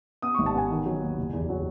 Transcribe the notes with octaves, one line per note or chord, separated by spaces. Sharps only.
B3 D#6
G#1 C#6
A5
B3 G#5
D#3
F#3
D#2
F#1
E2
F#3